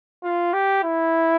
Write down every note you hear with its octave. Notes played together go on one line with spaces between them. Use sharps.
F4
G4
E4